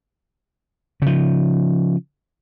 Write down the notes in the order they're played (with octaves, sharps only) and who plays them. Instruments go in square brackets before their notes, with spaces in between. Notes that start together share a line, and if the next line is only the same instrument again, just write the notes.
[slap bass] C#3 F3